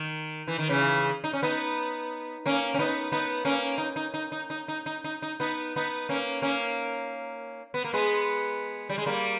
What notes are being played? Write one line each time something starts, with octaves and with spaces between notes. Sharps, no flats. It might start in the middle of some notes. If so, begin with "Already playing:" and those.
Already playing: D#3
E3
D#3
C#3 E3
D#4
C#4
B3 D#4
A#3 C#4
C#4
B3 D#4
B3 D#4
A#3 C#4
D#4
D#4
D#4
D#4
D#4
D#4
D#4
D#4
D#4
B3 D#4
B3 D#4
A#3 C#4
A#3 C#4
B3
A#3
G#3 B3
G3
G#3
G3 A#3